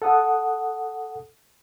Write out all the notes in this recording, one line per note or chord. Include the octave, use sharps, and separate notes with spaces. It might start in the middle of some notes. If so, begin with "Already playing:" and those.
A4 F#5 D#6